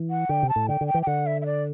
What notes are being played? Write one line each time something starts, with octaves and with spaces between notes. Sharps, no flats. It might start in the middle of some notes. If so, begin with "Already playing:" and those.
Already playing: E3
F#5
D3 G5
C3
A5
A2
D3 G5
D3
G5
E3
G5
D3 F#5
E5
E5
D5